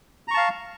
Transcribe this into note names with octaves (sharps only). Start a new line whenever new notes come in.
F5 A5 A#5 C#6